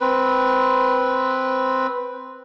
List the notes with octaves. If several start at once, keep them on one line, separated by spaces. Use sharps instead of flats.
C4 B4